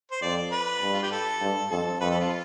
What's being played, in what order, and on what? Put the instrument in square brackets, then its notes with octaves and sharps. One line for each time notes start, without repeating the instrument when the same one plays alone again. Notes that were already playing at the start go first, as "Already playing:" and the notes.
[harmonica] C5
[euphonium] F2 [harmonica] D5
[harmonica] B4
[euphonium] G2
[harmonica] F4
G4
A4
[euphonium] G2
[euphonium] F2 [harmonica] A4
[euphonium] F2 [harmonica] B4
[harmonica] A4
F4